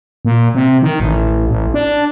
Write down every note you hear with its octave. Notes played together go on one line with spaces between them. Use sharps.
A#2
C3
D#3
A1
A1
D4